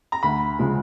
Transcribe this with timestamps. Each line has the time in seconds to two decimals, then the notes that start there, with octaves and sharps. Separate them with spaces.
0.12 A#5
0.23 D2 B5
0.59 C#3 F3 G#3